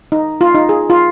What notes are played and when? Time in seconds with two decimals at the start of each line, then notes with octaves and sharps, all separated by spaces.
0.12 D#4
0.41 F4
0.55 D#4
0.69 G#4
0.90 F4